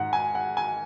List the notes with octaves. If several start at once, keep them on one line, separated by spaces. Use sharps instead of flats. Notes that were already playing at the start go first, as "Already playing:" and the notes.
Already playing: G#2 D#3 F#5
G#5
F#5
G#5